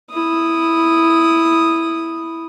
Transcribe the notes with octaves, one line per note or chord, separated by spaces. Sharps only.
E4 D#6